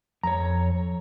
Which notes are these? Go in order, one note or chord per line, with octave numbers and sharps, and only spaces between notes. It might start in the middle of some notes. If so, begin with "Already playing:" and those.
F2 C#5 A#5